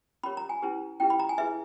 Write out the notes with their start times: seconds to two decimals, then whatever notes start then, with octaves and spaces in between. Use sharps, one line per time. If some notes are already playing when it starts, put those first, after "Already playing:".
0.23 C#4 G4 A#4 C#5 B5
0.37 A#5
0.49 G#5
0.62 C#4 E4 G4 B4
1.00 C#4 E4 G4 B4 G5
1.10 B5
1.20 A#5
1.29 G#5
1.38 E4 G#4 B4 E5